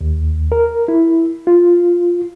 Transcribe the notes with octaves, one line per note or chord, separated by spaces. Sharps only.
D#2
A#4
E4
F4